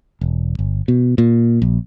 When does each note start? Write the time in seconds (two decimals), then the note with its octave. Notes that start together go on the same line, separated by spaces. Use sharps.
0.21 E1
0.59 G1
0.88 B2
1.18 A#2
1.62 A#1